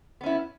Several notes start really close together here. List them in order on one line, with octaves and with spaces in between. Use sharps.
B3 C#4 E4